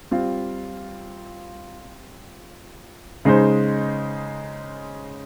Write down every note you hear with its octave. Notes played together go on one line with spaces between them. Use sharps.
G3 C4 F4
C#3 G#3 D#4 G#4 C5